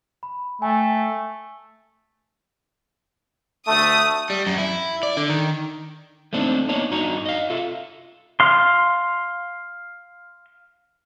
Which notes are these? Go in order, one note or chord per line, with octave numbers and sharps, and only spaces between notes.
B5
A3 G5 G#5
D2 A3 D#6
G3
F#2
E4
D5
D3
D#3
A3 A#3 C4 D4 D#4
A#3 B3 D4 D#4 C#5
G2 D4 D#4 F#4 A#5
D#5 F5
F4 A4 E5
F5 C6